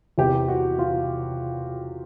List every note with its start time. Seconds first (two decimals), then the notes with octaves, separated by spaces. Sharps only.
0.18 E2 C3 E3 G4
0.48 F#4
0.79 F4